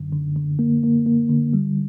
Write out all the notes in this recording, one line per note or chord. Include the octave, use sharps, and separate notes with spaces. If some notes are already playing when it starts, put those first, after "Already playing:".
Already playing: F#2 D3
D3
D3
A#3
A#3
A#3
D3
G3